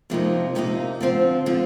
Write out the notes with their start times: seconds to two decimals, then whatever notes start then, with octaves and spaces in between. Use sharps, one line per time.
0.10 F2 C3 F3 A#3 D#4
0.55 F2 C3 F3 A#3 D#4
1.01 D3 F3 C4 F4
1.46 D3 F3 C4 F4